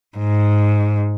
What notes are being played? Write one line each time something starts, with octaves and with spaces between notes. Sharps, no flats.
G#2